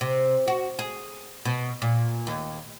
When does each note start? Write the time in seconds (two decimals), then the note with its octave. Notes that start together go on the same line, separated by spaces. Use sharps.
0.01 C3
0.47 F#4
0.79 G#4
1.45 B2
1.82 A#2
2.27 D#2